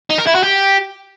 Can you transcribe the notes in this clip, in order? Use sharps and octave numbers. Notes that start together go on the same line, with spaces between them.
D#4
A#4
E4
F#4
G4